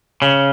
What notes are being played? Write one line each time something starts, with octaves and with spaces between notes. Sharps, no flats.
C#3